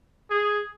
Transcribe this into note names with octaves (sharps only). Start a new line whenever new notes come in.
G#4